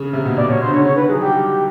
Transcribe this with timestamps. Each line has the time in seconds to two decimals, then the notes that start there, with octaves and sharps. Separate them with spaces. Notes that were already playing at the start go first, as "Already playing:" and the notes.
Already playing: C#3
0.13 C3
0.26 B2
0.37 B2 D5
0.49 B2 C#5
0.61 C5
0.65 D3
0.74 C#3 C#5
0.84 D3 C#5
0.96 D#3 B4
1.09 F#3 G#4
1.21 G3 G4
1.33 G3